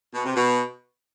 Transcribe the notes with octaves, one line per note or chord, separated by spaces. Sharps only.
B2
C3
B2